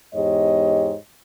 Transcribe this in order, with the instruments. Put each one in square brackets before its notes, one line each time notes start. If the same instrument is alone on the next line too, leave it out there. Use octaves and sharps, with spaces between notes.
[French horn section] E2 G#2 G4 C#5 D#5